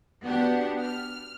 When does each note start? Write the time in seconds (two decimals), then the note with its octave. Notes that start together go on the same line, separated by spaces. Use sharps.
0.25 B3 D4 F#4 G4 F#5
0.84 F6